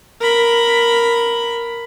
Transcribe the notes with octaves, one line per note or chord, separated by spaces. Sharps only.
A#4 B5